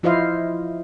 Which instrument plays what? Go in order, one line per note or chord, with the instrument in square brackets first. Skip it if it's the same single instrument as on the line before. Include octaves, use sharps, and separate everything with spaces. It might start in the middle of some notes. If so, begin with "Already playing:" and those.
[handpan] F3 E4 F4 C5 D#5 F5